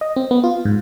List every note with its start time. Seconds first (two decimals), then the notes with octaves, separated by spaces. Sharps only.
0.01 D#5
0.16 C4
0.31 B3
0.44 F4
0.65 G#2